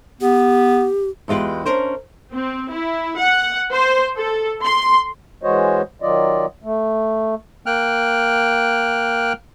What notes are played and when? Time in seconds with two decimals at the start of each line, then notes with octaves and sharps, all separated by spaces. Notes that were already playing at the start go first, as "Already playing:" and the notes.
0.21 B3 G4
1.28 E2 G#3 F4 G4 B4
1.66 C#4 D4 A#4 C5
2.32 C4
2.71 E4
3.20 F#5
3.72 C5
4.17 A4
4.64 C6
5.43 E3 G#3 F#4 C5 C#5 D#5
6.02 D#3 F#3 F4 D5 D#5
6.63 A3
7.66 A#3 G5 F6 F#6